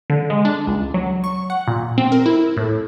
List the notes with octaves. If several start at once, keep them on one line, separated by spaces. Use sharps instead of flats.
D3
G#3
D4
C#2
F#3
C#6
F#5
A#2
C4
A#4
E4
A2